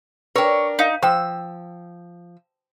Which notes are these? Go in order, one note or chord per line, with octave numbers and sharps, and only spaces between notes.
D4 A#4 B4 C#5 G5
D#4 F5
F3 C5 G5 E6